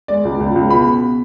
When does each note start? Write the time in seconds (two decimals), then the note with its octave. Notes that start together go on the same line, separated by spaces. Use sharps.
0.08 G#3 D5
0.25 C#2
0.40 C#2
0.56 C#2
0.70 B2 B5
0.87 B2